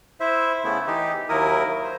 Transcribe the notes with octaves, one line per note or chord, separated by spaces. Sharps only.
E4 C5 E5
C#3 A3 B3 E4
E3 D#4 G4
D#2 F#3 E4 A#4 D#6
C5